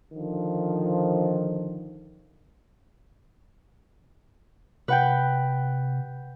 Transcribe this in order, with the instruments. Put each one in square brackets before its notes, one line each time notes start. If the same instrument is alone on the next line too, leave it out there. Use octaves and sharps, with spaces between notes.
[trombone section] D3 D#3 F3
[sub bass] C3 [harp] B4 F#5 G5